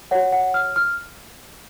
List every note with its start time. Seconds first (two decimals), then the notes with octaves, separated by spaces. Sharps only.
0.11 F#4 C#5 F#5
0.32 F#5
0.54 F6
0.76 F6